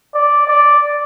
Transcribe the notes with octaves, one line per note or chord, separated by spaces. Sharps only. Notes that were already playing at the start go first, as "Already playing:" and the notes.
D5
D5